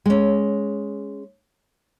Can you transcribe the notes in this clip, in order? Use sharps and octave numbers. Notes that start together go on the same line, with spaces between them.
G#3 C#4